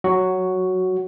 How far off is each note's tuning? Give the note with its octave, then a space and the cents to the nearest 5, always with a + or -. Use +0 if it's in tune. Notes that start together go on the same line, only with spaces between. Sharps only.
F#3 +0 F#4 +0